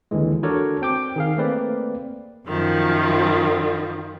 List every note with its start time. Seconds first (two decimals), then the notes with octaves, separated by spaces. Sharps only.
0.11 D#2 D3 E3 G#3
0.43 D4 F#4 A4 A#4 C#5 D5
0.81 C4 G5 D6
1.16 D#3 G#4 F5
1.37 A3 A#3 C4 B4 D5
2.47 F#2 D#3 F3